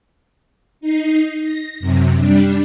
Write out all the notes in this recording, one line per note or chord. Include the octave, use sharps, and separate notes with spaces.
D#4 C7
A#6
F#2 C3
G3 D4